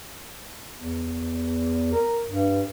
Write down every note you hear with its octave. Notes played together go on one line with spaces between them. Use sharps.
E2
A#4
G2